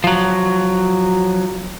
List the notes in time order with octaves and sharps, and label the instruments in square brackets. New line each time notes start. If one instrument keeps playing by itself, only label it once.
[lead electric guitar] F3 F#3